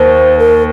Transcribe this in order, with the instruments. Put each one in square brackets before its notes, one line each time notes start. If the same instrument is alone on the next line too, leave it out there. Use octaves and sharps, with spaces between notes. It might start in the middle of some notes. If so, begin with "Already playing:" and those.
Already playing: [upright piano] D#2 [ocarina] C5
[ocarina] A#4